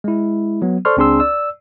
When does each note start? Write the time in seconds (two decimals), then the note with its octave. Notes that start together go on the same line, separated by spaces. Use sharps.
0.04 G#3 E4
0.62 F#3 B3
0.85 A4 C5 D5 C6 C#6 F6
0.97 C#2 C4 D4 G#4 C6 E6
1.20 D5 E6